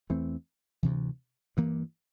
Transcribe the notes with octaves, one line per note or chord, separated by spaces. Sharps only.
E2 E3 A3 C4
D2 C3 E3
G2 E3 A#3